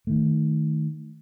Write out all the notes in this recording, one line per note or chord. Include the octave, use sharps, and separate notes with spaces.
D#3 A3